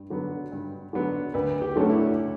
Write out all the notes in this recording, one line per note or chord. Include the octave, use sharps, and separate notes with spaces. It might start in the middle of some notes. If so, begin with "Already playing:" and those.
Already playing: G2
D3 F#3 B3
G2
D3 F#3 B3
D2 B4
G4
D3 F#3 A3 C#4
E4